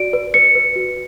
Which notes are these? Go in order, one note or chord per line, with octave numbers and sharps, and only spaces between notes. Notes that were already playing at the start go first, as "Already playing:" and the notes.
Already playing: F#4 D5 D7
B4
B4 C#7
B4
F#4